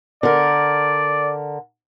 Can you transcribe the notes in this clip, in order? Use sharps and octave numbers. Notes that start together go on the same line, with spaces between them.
D3 A#4 D5